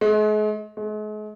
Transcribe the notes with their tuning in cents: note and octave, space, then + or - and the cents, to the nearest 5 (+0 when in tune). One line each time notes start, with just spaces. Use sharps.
G#3 +40
G#3 +40